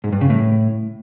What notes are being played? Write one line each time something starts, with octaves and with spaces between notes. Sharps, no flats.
G#2
G2
C#3
A2